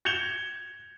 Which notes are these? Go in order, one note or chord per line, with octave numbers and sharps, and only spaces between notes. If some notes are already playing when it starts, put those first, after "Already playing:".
G6 G#6 C#7 E7 F7 G7